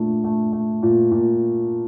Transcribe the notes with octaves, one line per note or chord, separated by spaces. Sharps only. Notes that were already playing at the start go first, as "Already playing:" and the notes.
Already playing: A#2 A3 D4
A3
A3
A#2
A#2